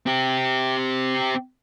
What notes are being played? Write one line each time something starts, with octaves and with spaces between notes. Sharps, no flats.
C4 G4